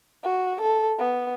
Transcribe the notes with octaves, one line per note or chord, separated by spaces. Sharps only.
F#4
A4
B3